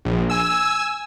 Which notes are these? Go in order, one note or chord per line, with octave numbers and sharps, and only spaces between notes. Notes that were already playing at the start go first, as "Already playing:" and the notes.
A#1
G#5 E6